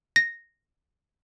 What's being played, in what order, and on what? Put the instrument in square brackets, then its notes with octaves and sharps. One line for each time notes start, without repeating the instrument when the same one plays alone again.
[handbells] A#6